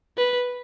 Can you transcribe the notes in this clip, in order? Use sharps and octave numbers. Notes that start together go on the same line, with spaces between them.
B4